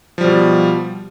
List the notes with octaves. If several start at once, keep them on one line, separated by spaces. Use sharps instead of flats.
B2 F3 G3